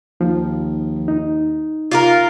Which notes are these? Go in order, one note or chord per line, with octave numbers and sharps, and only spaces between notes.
D#2 F3
D#4
F4 F#4 A#4